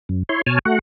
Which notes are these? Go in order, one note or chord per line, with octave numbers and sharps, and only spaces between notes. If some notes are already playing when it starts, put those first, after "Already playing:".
F#2
E4 C#5 C6
B2 C#5 G#5 A5 F6
A3 F#4 F#5